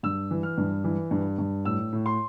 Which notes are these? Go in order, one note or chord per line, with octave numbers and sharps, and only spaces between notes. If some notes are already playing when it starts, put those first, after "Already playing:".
G2 E6
E3
F6
G2
E3
G2
G2
A2 E6
A2
C6